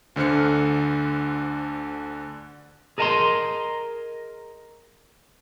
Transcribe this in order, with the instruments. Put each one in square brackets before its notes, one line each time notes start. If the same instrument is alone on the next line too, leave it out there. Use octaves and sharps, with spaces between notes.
[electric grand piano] D2 D3 C5 F6 C#7
[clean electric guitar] G#4 A#4 D#5 A5 A#5 C6